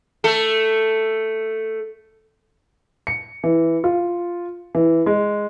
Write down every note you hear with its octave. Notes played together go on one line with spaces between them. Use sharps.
A3 A4
C#7
E3
F4
E3
G#3